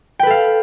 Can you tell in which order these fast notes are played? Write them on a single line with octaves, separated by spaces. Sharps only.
G5 B4 A4 F5